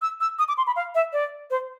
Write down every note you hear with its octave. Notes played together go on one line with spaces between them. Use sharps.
E6
E6
D#6
D6
C6
B5
F5
E5
D5
C5